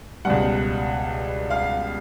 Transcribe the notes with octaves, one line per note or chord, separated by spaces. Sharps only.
C#2 B2 G3 F#5
F5